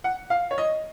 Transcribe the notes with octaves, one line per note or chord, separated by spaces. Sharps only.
F#5
F5
C#5
D#5